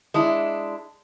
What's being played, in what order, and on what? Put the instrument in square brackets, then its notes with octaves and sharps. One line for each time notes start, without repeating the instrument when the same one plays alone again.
[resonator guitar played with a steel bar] G#3 D4 E4